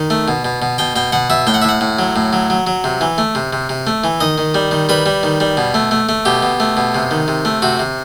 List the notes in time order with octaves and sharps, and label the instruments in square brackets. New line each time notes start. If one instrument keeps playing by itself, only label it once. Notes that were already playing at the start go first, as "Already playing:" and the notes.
Already playing: [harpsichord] D#3
A3
B2
B2
B2
B2 G5
B2 G5
B2 F#5
B2 E5
A2 G5
F#5
E5
A2 F#5
A2
F#3
A2
F#3
F#3
F#3
C3
E3
A3
C3
C3
C3
A3
E3
D#3 D#5
D#3
G3
D#3
G3 B4
G3
D#3
G3
B2
A3
A3
A3
B2 G4
B2
A3
B2
C3
D#3
C3
A3
C3 F#4
C3